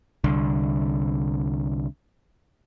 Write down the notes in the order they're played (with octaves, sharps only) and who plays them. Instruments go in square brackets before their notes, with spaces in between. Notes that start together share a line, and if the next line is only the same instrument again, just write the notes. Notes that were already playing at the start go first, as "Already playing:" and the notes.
[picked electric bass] C2 D3